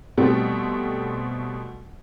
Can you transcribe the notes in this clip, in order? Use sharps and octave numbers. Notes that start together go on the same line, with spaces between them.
B2 G3 A3 C4